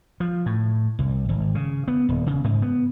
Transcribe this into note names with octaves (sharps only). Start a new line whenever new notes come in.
F3
A2
C2
G#1
C#3
B3
D#1
C#3
G#2
B3